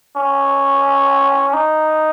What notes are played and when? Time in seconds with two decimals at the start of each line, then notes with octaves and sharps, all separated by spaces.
0.17 C#4
1.53 D#4